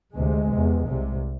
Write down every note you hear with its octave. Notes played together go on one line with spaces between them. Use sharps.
D2 C3 G#3
E2 C3
C2 C3